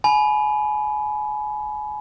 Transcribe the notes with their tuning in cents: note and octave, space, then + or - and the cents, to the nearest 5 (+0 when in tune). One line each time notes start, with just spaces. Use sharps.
G#5 +30 B5 +0